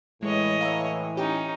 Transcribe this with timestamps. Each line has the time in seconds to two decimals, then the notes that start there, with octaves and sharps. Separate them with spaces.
0.23 A2 E3 G#3 C#5 D#5
0.61 F5 A#5 E6
1.17 C#4 D#4 G4 G5